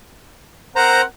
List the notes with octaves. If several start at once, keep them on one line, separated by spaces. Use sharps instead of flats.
C4 A#4 C5 F#5 A#5